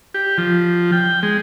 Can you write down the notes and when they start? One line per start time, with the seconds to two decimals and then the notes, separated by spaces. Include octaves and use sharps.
0.14 G4
0.38 F3
0.92 G5
1.23 G#3